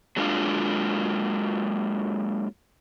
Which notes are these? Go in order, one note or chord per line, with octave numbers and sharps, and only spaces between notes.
F#3 G#3 A#3 D4 F4 F5